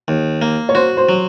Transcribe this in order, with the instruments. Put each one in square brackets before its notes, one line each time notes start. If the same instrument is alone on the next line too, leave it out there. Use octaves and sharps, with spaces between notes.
[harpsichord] D#2
A#3
[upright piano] C#5
[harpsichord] F#4 [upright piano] C5
[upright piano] C5
[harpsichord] F#3